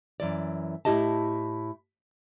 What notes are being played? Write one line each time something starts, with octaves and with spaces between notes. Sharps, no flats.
F#2 E3 D5
A2 E4 G4 D#5 A5